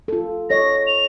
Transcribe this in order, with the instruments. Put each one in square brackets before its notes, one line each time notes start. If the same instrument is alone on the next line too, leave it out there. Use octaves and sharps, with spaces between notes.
[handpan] F4 A4
[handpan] A4 C#5 D#5 [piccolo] A#6
[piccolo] F7